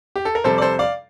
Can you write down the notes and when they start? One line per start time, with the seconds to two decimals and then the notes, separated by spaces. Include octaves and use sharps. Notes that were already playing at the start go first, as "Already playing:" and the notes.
0.16 G4
0.25 A4
0.35 A#4
0.44 F2 C3 G3 C4 A4 C5
0.58 D5
0.62 A4 C5
0.79 D5 F5